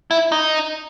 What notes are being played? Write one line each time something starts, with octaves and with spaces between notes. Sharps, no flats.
E4
D#4